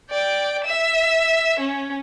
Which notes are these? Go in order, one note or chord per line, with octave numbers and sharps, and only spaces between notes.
D5 G5
E5 E7
C#4